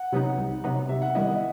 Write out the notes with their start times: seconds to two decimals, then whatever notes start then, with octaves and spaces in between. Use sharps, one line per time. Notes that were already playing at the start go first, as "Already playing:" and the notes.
Already playing: F#5
0.12 C3 F#3 B3 D#4
0.38 C2
0.64 C3 F#3 B3 D#4
0.89 C3 E5
1.02 F#5
1.15 D#3 G3 B3 E4 D#5
1.27 D#5